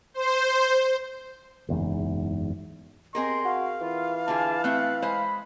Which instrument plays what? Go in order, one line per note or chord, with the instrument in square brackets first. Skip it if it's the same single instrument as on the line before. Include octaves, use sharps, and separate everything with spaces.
[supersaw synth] C5
[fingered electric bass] F#1 E2 G#2
[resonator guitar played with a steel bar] C4 G#4 A#4 [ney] D#5 [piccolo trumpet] C6
[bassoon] F#4 [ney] F5
[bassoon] E3 [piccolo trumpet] F4
[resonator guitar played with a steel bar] D3 F4 G#4 [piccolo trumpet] A5
[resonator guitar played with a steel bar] A3 C4 E5 [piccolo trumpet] F#6
[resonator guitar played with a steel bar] G#3 C5 [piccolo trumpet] B5